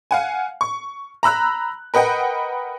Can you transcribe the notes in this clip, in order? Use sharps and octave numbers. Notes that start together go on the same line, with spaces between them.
F5 F#5 G#5
C#6
A#5 B5 E6 F#6
A#4 B4 D#5 F#5 G5